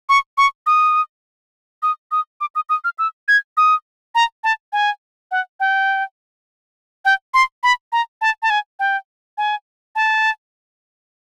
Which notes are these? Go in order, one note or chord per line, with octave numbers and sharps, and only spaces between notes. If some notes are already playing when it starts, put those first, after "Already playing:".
C#6
C#6
D#6
D#6
D#6
D6
D#6
D#6
F6
E6
G#6
D#6
A#5
A5
G#5
F#5
G5
G5
C6
B5
A#5
A5
A5
G#5
G5
G#5
A5